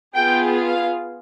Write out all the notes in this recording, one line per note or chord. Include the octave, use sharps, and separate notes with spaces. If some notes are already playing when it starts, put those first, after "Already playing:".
B3 F4 G#4 G5
F5